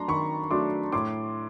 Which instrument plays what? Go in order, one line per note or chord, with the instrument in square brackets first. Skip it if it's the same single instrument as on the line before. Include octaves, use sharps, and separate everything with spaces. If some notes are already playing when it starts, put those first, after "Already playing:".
Already playing: [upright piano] F#3 A3 D4 A5 A#5 C6
D#3 B5 C#6
F#3 A3 D4 C6 D6
A2 C6 D6